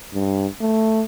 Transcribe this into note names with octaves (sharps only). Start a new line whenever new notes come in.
G2
A3